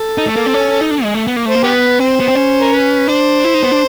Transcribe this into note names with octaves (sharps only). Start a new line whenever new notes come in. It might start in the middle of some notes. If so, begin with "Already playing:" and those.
Already playing: A4
D#4
A3
A#3
C4
C#4
D#4
D4
G#3
A3
B3
A#3
A3 C5
A#3
B3 G4 B4
C4 C5
B3
C4
C#4
A#4
B4
D4 C5
E4
D#4
B3
D4